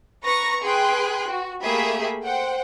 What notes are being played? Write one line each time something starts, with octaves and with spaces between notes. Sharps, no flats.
B4 A#5 C#6 A#6
G#4 B4 G5 C6 F#6
F#4
A3 A#3 G4 G#4 E5 B5
C5 F#5 G5